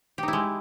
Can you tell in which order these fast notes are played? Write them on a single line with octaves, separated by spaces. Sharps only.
G4 D#4 E4 G#3